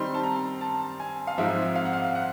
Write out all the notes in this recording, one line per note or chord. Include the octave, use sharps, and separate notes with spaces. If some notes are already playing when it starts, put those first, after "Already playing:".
Already playing: D#3 G3 C4 D#4 C6
A5
A#5
A5
G#5
F5
G#2 F3 G#3 C4 D#4 E5
F5
F#5
F5
F#5